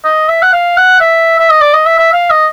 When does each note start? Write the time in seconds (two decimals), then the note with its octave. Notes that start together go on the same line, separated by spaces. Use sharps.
0.04 D#5
0.29 E5
0.43 F#5
0.53 F5
0.78 F#5
1.00 E5
1.39 E5
1.50 D#5
1.61 D5
1.73 D#5
1.86 E5
1.98 E5
2.13 F5
2.30 D#5